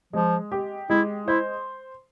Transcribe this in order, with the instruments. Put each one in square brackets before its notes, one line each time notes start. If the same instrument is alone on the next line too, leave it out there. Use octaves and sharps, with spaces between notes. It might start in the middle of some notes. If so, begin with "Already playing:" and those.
[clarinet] F3 [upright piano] G#3
[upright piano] G4
[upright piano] G#3 [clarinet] E4
[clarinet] E4 [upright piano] C5